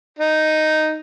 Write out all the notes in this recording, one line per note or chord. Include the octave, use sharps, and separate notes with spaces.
D#4